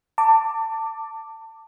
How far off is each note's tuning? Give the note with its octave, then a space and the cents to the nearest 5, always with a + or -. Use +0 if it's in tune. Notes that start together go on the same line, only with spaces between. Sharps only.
A5 +25 D6 +0